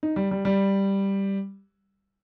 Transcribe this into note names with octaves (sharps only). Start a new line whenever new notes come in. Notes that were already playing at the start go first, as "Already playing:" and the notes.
D#4
G3
G3
G3